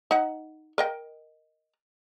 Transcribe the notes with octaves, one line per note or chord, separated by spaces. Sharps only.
D#4 F#5
A#4 D#5 G5